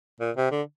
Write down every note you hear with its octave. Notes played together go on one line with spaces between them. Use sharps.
A#2
C3
D3